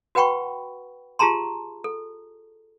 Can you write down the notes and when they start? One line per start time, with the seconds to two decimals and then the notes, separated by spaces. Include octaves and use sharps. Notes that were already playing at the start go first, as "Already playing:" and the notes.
0.15 F#4 B4 F#5 G5 B5 C#6
1.19 F4 G4 G#4 A5 A#5 C6
1.84 A4